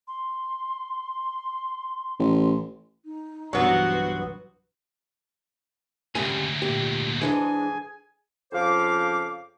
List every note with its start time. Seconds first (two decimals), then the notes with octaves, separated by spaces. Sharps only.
0.08 C6
2.19 A1
3.05 D#4
3.53 B1 G2 E3 F#3 B3 F#4 C5
3.93 B4
6.15 D2 G#2 C#3 G3 G#5
6.62 A#2 G4
7.21 G#2 E3 G#3 D4 G#4 G#5
8.52 F2 C#3 F3 C5 F5 D6